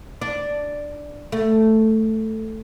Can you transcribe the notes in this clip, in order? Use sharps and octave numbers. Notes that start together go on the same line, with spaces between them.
D4
A3